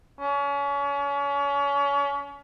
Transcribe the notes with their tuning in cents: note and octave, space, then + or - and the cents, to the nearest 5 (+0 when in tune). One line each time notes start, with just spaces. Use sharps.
C#4 +35